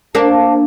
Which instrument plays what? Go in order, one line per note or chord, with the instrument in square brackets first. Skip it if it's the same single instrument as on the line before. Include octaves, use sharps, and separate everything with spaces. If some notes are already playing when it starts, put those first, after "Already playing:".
[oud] A#3 D4 [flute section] C5 F5 A5